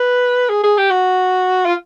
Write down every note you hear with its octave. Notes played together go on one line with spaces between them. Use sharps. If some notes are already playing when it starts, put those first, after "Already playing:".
Already playing: B4
G#4
G#4
G4
F#4
F4